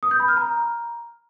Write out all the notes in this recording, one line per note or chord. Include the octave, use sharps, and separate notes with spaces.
D#6
G6
B5
F6
A#5